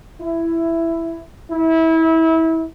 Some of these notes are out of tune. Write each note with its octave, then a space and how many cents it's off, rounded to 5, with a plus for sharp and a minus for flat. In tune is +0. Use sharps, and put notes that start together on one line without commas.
E4 +10
E4 -25